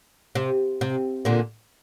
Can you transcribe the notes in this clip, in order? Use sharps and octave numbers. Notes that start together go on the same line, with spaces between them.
C3
C3
A#2 D3